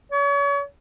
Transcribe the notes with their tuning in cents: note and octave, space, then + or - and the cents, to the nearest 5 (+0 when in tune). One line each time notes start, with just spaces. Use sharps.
C#5 +35